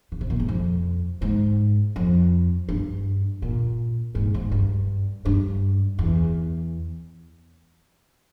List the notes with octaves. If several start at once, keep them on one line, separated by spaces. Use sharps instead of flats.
C#3
C3
A#2
G#2
F2
G#2
F2
G2
A#2
G#2
G#2
G2
G2
E2